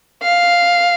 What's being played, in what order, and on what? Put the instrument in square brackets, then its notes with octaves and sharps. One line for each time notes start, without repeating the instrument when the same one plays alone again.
[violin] F5